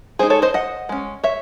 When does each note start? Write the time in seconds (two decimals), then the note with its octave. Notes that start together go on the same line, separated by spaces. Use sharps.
0.19 G#3 D#4 G#4 C5
0.30 A4 C#5
0.42 C5 D#5
0.54 D#5 F#5
0.89 G#3 C#4
1.24 C#5 E5